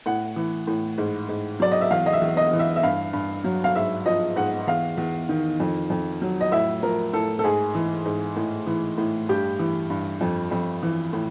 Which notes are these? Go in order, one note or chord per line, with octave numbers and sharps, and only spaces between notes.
A2 F#5
E3
A2
G#2
G#2
F#3 D5
D#5
E5
E2 F5
D#5
E5
E2
D#5
E3
E5
E5
G2 F5
G2
F#3
F5
G#2 E5
F3 D#5
G#2 F#5
E2 F5
E2
D#3
F2
F2
F#3
D#5
A2 E5
F3 A#4
A2 A4
A4
G#2 G#4
E3
G#2
A2
E3
A2
G2 G4
E3
G2
F2
F2
E3
A2